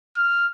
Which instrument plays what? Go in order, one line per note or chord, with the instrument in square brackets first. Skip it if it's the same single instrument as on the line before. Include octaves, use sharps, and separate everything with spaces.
[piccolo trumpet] F6